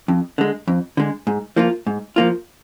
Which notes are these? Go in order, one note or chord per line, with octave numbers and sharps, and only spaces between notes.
F2
D3 G#3
F2
D3 G#3
G#2
F3 A#3 F4
G#2
F3 A#3 F4